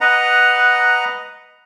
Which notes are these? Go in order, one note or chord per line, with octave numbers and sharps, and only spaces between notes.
B4 D#5 F#5 A#5